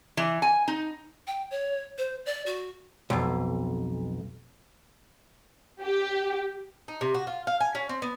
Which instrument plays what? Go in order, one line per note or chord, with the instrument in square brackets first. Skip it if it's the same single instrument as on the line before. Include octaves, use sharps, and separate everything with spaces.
[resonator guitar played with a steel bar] E3
G#5
D#4
[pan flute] G5
C#5
C5
D5
F#4
[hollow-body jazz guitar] B1 F2
[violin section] G4
[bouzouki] D#4
C3
F#4
F4
F5
G#5
C#4
C4
B3